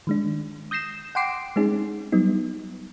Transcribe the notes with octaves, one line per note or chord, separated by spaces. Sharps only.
D#3 G#3 D4
D#6 G6 A#6 C7 E7
F#5 G5 C6 D6 C7 D7
G#3 C4 C#4 D#4 G#4
F#3 G3 B3 D#4